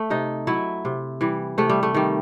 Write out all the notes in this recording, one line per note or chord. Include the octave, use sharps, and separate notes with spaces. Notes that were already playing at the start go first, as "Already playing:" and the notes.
Already playing: A3
C3 D#4
F#3 E4
C3
E3 G3
C3 A3
G3
A3
D#3 G3